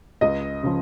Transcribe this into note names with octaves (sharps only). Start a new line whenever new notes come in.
C#2 D#5
C#3 F3